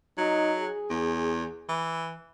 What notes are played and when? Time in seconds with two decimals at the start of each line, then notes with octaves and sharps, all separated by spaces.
0.18 F#3 D#4
0.58 G#4
0.90 E2
1.69 E3